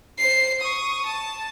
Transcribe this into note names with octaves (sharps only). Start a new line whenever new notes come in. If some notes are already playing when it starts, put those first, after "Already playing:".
C5 C7
C#6 D#6
A5